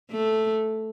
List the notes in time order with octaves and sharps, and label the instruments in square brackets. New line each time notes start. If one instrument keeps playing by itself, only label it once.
[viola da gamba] A3